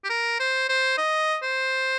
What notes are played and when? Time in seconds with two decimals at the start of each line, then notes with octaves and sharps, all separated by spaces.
0.04 G4
0.10 A#4
0.39 C5
0.69 C5
0.98 D#5
1.43 C5